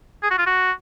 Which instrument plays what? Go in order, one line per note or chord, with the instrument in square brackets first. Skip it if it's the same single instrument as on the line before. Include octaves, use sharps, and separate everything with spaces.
[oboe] G#4
F#4
F4
F#4